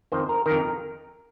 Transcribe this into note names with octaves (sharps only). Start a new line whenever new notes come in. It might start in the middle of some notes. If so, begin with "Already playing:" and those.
F2 D#3 C5
A#4
D#3 A#4
F2